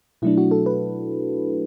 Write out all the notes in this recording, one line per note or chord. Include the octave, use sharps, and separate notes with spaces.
B2 F#3 A3 D4 E4
F#4
A4
B4